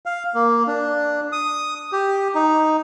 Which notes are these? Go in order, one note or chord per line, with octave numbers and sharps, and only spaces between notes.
F5
A#3
D4
D#6
G4
D#4